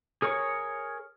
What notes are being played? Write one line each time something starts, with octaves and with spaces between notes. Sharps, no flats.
G#4 A#4 C#5 C#6